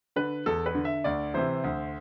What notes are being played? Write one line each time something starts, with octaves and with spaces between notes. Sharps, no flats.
D3 B4
E2 A4
B4
D3
E5
D2 D5
C3 E3 C5
D2